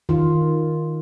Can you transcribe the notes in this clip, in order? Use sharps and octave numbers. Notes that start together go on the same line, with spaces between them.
D#3 F4